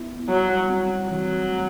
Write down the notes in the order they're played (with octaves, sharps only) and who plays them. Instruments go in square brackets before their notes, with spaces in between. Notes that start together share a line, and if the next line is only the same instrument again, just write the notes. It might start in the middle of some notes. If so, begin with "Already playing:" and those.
Already playing: [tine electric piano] B3 E4
[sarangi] F#3 [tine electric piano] G3
[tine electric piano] C4
[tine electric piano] E3 [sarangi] F#3
[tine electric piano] A3